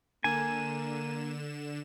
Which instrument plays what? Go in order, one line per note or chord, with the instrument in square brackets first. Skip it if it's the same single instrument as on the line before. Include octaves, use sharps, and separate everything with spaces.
[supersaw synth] D3 E7 [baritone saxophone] A#3 [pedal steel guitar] G#5